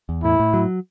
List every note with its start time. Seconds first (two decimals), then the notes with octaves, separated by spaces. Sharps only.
0.09 E2
0.23 A2 E4
0.40 A2
0.54 F#3